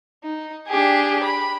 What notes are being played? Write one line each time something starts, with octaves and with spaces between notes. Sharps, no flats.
D#4
D4 G4 G#4
B5